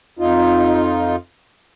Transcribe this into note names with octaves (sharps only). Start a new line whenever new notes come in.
F2 D#4 F4